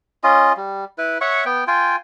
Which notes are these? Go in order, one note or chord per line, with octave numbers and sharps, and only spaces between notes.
C#4 F4 D#5
G3
E4 B4
C#5 E5 F#5 C#6
B3 G5
F4 G5 G#5